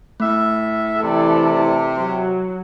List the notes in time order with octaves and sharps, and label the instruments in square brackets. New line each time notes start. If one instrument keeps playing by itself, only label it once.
[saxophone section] A2 E5 [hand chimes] A3
[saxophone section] C3 [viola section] E3 A4 D5
[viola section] F#3